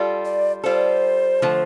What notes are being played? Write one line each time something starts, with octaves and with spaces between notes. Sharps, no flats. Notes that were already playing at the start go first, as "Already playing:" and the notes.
Already playing: G3 F4 A4
D5
G3 F4 A4 C5
D3 F3 A3